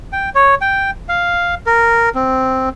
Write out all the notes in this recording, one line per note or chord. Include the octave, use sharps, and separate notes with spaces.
G5
C#5
G5
F5
A#4
C4